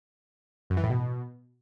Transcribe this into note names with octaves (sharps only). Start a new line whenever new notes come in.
F#2
E3
A2
B2